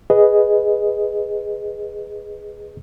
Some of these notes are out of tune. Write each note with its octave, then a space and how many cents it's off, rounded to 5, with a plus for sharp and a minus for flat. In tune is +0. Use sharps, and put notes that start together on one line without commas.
G#4 -5 B4 +0 D#5 +0